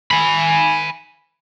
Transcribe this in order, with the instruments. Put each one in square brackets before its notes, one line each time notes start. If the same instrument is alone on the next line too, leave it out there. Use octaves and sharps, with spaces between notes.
[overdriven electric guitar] G#5 B5